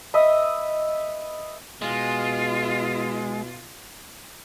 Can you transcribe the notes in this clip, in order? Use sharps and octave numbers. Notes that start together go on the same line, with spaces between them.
B4 D#5 E5
B2 G#3 F4